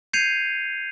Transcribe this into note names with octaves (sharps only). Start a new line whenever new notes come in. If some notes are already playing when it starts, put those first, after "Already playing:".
G6 G#6 C7 C#7 D#7 F7